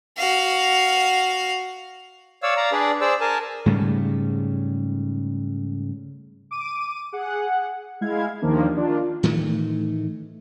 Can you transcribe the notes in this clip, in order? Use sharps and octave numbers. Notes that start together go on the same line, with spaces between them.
F#4 F5
C#5 D5 F5 E6
D5 F5 A#5
D4 G#4 B4 D5
G#4 C5 D5 E6
A#4 G#5 A5
G#2 C#3 G3 A3
D6 D#7
G#4 F#5
G#3 E4 F5 G#6
D#2 D#3 F3 A#3 D4
D#3 D4 F4
A2 D#3 E3 A3